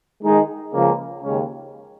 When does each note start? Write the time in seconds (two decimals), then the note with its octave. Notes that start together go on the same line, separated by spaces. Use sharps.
0.22 D#3 G#3 D#4 G#4
0.73 C#2 C#3 F3 A#3
1.23 D#2 C#3 G#3 C#4